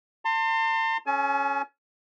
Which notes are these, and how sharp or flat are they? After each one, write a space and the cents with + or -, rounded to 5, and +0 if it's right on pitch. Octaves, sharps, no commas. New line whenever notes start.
A5 +45 C6 +0
C#4 +0 A4 -45 G#5 +40